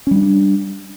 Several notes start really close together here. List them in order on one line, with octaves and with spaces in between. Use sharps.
C#4 G3 D4